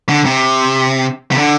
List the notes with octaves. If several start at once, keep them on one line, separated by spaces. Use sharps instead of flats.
D3
C3
C3
D3